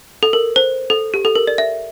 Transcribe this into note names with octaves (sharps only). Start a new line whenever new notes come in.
A4
A#4
C5
A4
G4
A4
A#4
D5
E5